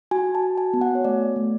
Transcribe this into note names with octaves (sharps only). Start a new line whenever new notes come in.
F#4 G#5
A5
F#4
G#5
B3
F#5
C#5
A3 D5
A3